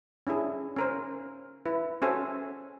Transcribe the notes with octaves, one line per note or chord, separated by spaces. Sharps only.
C#4 D4 E4 G#4
C#4 A#4 C5
E4 B4
C#4 F#4 A4 C5 E5 G#5